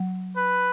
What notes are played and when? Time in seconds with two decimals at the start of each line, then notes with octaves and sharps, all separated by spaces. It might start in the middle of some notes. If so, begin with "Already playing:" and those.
Already playing: F#3
0.37 B4